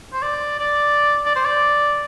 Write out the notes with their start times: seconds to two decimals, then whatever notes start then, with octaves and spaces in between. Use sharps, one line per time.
0.13 C5
0.22 D5
0.60 D5
1.25 D5
1.36 C5
1.45 D5